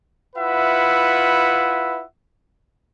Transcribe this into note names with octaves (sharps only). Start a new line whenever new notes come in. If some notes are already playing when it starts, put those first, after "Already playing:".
E4 F4 B4 E5 F#5